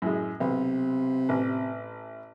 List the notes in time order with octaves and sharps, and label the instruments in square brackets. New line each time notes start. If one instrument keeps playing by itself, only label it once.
[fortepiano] F#2 A2 G#3
[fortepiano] B1 [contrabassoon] C3
[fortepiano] A1